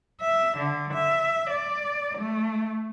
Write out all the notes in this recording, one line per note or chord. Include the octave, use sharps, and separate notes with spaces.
E5
D3
E5
D5
A3